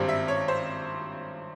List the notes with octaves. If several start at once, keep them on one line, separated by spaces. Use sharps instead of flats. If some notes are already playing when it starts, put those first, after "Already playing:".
Already playing: G#1 G2 G3 C4
E5
C#5
C5